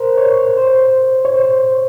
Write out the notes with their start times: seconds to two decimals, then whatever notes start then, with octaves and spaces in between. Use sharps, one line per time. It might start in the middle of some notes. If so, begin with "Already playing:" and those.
Already playing: A#4 C5
0.17 C#5
0.57 C5
1.25 C#5
1.36 C5